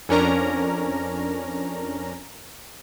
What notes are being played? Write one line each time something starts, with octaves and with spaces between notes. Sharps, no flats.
F2 C#4 D4 A#4 A#5